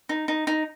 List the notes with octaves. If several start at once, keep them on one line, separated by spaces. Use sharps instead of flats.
D#4
D#4
D#4